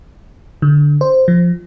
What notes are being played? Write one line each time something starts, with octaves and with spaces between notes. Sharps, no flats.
D3
C5
F3